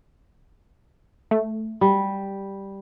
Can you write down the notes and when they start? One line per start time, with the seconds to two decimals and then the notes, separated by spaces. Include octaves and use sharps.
1.31 A3
1.81 G3